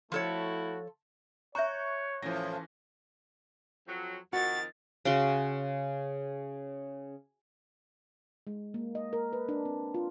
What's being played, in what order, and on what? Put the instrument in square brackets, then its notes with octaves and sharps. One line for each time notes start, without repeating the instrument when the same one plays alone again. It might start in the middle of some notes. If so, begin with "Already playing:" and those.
[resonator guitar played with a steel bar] F3 A4 C#5 [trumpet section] A3 E4 F#4
[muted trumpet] C#5 [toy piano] E5 A#5 [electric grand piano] C#6 F#6 G6
[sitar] A2 F3 [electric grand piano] E3 C#4 A#6
[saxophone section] F2 F3 F#3
[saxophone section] F2 D#3 [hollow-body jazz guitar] F#4 [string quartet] A6
[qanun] C#3 C#4 F#4 C6
[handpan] G#3
A#3
D#5
A#4
B4
D4
C4
F4